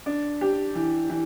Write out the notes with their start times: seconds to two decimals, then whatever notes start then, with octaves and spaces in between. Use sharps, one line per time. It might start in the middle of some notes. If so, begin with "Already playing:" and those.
0.06 D4
0.41 G4
0.75 E3
1.09 E3